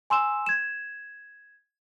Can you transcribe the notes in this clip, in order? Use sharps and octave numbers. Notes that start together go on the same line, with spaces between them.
G#5 C6 E6 E7
G#6 E7